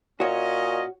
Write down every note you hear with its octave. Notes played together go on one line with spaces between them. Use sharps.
A#2 C#4 F#4 C#5 D#5